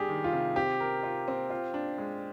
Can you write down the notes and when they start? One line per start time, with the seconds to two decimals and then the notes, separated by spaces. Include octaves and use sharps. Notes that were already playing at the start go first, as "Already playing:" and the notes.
Already playing: G3 D4 G4 G#4
0.09 D#3
0.24 F4
0.33 C3
0.56 C4 G4
0.80 A#4
1.03 F4
1.28 C4
1.50 F4
1.74 D4
1.98 G#3